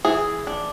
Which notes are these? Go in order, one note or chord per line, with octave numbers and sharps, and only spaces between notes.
E3 G#4
D4